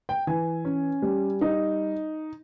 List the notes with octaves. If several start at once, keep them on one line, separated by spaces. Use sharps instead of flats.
G5
E3 G#5
C#4
G3
D#4